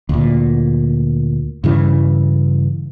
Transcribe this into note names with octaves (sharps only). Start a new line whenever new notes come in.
D2 A#2
G2 C#3 E3